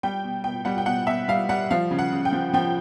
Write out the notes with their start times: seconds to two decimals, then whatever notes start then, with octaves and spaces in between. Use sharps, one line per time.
0.03 G3 G5
0.24 B2
0.44 B2 G5
0.65 G3 F#5
0.78 G5
0.86 B2 F#5
1.07 B2 E5
1.28 G3 F5
1.49 G3 F#5
1.71 F3 F5
1.91 C#3
1.99 F#5
2.12 C#3
2.25 G5
2.32 F3
2.53 F3 G5